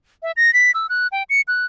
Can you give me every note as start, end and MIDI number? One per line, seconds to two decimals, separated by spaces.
0.23 0.32 76
0.37 0.53 94
0.53 0.71 95
0.74 0.87 88
0.89 1.07 90
1.12 1.23 79
1.30 1.41 97
1.48 1.66 90